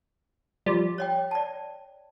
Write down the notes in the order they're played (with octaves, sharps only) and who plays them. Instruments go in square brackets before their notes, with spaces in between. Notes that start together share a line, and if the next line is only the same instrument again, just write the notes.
[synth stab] F3 G3
[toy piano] C#5 D#5 G5
D5 A5